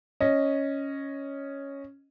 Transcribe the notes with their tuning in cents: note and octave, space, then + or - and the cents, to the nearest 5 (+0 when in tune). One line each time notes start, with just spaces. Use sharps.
C#4 +0 D#5 +0